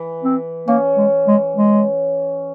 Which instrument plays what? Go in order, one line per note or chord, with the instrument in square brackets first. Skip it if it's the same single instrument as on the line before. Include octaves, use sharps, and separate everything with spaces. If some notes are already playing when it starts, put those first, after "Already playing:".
Already playing: [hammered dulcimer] E3
[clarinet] C4
[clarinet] A#3 [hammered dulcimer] C#4
[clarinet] G#3
G#3
G#3